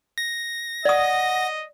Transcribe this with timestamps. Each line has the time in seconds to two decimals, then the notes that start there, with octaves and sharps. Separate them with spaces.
0.18 A#6
0.85 D5 D#5 F#5 D#6